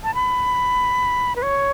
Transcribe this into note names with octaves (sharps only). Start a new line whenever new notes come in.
A5
B5
B4
C#5